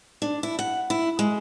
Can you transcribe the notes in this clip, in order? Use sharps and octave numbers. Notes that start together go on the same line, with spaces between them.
D4
E4
F#5
E4
G#3